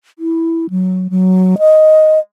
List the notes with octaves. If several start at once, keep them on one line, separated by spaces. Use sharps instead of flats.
E4
F#3
F#3
D#5